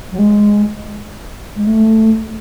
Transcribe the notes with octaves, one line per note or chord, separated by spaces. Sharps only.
F#3
G#3
G#3
A3